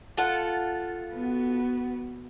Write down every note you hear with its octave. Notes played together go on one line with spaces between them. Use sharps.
F4 A4 F#5
B3 F#4